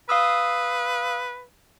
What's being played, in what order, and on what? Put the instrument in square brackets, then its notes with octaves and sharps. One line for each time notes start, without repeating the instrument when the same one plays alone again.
[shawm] B4 [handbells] F5 D#6 E6